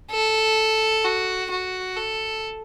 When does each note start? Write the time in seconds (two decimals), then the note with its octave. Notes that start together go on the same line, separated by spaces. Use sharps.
0.11 A4
1.04 F#4
1.51 F#4
1.96 A4